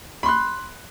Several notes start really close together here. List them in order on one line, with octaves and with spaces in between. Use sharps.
B5 C6 F#6